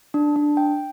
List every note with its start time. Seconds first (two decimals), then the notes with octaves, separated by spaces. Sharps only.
0.14 D4
0.36 D4
0.57 G5